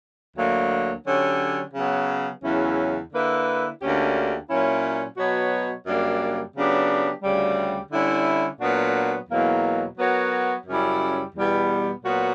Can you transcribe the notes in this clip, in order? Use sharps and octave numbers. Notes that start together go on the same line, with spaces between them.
D2 D3 F#3 A#3
D3 F#3 C#4 G4 C#5
C#3 F#3 B3
E2 C#3 F#3 C#4 E4
D3 A#3 E4 B4
D2 D3 A#3 C#4 G4
A#2 F#3 C#4 E4
B2 F#3 B3 F#4 C#5
F#2 C#3 G3 A#3 D4
C#3 F#3 B3 D4 G4
D2 C#3 G3
D3 G3 C#4 E4
A#2 F#3 B3 D4 F#4
E2 B2 F#3 A#3
F#3 B3 F#4 A#4 C#5
F#2 C#3 G3 C#4 E4
E2 B2 G3 B3
A#2 F#3 B3 F#4